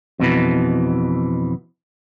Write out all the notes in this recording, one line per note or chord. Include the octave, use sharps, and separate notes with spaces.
F2 B2 E3